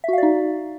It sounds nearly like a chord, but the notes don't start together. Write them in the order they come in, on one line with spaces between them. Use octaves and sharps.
E5 F#4 F5 D5 D#4